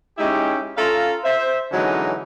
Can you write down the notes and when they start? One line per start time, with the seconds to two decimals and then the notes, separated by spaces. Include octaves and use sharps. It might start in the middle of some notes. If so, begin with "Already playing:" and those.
0.18 G#3 C#4 D#4 E4 G4
0.76 C#4 F4 A4 F5 A#5
1.24 C5 E5
1.72 D3 E3 F#3 G#3 C#4 D#4